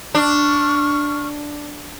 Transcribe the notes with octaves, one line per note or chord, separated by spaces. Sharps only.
D4 C#6 F6